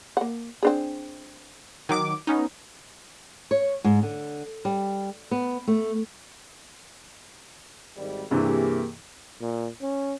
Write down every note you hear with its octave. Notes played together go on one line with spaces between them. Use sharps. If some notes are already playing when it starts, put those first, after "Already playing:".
A#3 F#5
C4 D4 G#4
D#3 F#3 D6
B3 C#4 D#4
C#5
G#2
D3
G3
B3
A3
G#1 G3
G2 C3 E3 A#3 G4 G#4
A#2
C#4